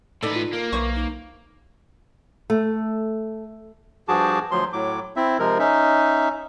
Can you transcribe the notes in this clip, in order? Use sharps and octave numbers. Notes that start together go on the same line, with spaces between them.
A2 D#4 A4 B4 D5 D#5
F4
A#3 A#4
B1 E3 C5 C#6
D#4
A3
G2 F3 F#4 G#4 A5 D6
D2 F3 F#3 C6
A2 F#3 D6
C4 E4 E5
C3 F3 G#3 A#4
C#4 D#4 E5